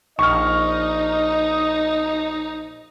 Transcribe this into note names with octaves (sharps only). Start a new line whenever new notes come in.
A#1 D#4 D#5 C#6 F6